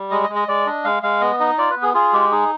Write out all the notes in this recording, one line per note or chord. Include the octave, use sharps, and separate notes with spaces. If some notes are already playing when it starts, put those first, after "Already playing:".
Already playing: G3
G#3 D#5
D#5
G#3
D#5
G#3 D5
D4 D#5
G#3 F5
G#3 F5
B3 D#5
D#4 D#5
F4 D5
B4
B3
G#4
F4 G#4
G#3 G4
D#4 G#4